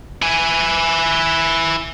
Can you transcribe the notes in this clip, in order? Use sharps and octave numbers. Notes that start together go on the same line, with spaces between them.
E4 G#5